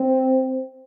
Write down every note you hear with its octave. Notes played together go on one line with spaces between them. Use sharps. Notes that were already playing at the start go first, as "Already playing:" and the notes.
Already playing: C4